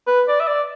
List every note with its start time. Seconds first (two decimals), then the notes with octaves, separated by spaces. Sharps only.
0.07 B4
0.28 D5
0.40 E5
0.47 D5